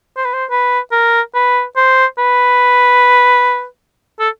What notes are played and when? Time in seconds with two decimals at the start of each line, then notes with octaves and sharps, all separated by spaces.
0.17 C5
0.24 B4
0.33 C5
0.50 B4
0.91 A#4
1.34 B4
1.76 C5
2.18 B4
4.20 A4